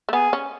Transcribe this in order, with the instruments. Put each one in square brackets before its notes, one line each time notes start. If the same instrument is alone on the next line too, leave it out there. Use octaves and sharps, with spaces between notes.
[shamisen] A3
[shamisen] B3 [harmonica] G#4
[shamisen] C#4